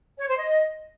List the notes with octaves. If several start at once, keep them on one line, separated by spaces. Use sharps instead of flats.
C#5
C5
D#5